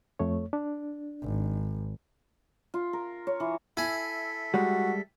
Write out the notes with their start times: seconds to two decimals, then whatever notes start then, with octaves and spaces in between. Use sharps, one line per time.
0.19 F2 A3 C#5
0.53 D4
1.22 G#1
2.74 F4
2.93 A#4
3.27 C#5
3.40 E3
3.77 E4 A4 E5 G#5
4.54 G3 G#3 F#4